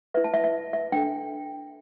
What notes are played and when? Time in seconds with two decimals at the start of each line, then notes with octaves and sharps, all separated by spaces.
0.14 B4 E5
0.17 E4
0.24 A5
0.34 E5
0.44 E5
0.73 E5
0.92 D4 A4 G5